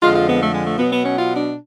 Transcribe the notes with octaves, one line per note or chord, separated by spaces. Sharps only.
F2 D3 F3 G#3 F4
F4
B3
A3
G#3
A3
B2 F#3 B3
B3
C#4
F4
D4